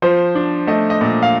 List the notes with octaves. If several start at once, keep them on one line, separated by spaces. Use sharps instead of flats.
F3 C5
D4
A3 D#5
D#5
A#2
F5